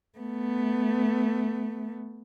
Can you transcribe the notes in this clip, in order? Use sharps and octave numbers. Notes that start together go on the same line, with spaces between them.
A3 B3